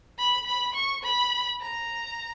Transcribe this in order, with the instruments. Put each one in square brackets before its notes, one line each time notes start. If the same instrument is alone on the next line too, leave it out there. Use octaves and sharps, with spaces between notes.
[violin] B5
B5
C#6
B5
A#5